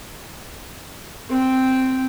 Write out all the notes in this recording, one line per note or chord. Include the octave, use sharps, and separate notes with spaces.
C4 G5